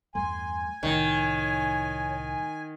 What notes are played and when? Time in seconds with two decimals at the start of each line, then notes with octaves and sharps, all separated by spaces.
0.15 E2 G2 A3 G#5 C6
0.83 C2 A2 D#3 C#5